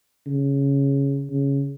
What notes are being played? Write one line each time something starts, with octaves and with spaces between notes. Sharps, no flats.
C#3
C#3